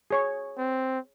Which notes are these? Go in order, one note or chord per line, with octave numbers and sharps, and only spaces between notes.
G#4 C#5 C#6
C4